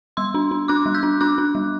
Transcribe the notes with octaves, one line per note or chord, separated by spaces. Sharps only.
G3 C6 E6
D4
D4
D4 D6 F#6
G3
E6 G6
D4
D4 D6 F#6
D4
G3